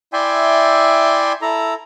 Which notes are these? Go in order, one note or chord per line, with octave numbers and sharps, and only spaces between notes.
E4 D5 E5 G5 G#5 C6
E4 A4 A#5